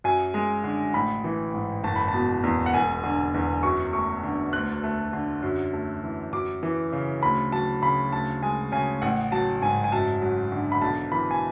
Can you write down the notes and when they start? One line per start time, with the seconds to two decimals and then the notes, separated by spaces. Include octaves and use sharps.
0.04 F#2 G#5
0.34 G#3
0.64 D3
0.94 A1 B5
1.24 E3
1.54 G#2
1.84 F#1 A5
1.96 B5
2.08 A5
2.14 B2
2.44 E2
2.66 F#5
2.74 E1 G#5
3.04 D3
3.34 E2
3.63 F#2 C#6
3.93 A3 C#6
4.23 D3
4.53 D2 F#6
4.83 A3
5.13 D3
5.43 F#2
5.73 A3
6.03 E3
6.33 F#2 D6
6.63 E3
6.93 C#3
7.23 D2 B5
7.52 F#3 A5
7.82 C#3 B5
8.12 D2 A5
8.43 G#3 G#5
8.72 C#3 G#5
9.02 A1 F#5
9.32 F#3 A5
9.62 G#2 G#5
9.84 G#5
9.92 F#2 A5
10.22 F#3
10.52 D3
10.72 B5
10.81 B1 A5
11.12 E3 B5
11.31 G#5